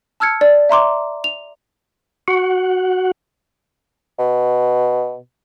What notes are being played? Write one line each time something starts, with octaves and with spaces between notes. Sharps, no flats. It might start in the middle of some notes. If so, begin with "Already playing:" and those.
A5 E6 F6 G#6 C#7
D5
E5 A#5 C6 D6
F7
F#4 F#5
B2